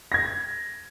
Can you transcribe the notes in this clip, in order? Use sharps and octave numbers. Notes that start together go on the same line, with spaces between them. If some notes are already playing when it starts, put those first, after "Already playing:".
G#6 A#6